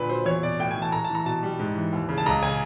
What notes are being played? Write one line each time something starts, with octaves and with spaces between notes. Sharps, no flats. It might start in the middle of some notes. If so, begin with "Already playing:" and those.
Already playing: A#2 D3 B4
F#3 C5
E2 C#5
B2 D5
A2 G5
G#5
E3
A5
A2 A#5
A5
E3
A#5
B2 A5
G3
G#2
E3
D#2
C#3
A5
C#2 A#5
C#3 G#5